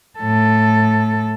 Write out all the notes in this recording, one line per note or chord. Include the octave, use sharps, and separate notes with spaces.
A2 A4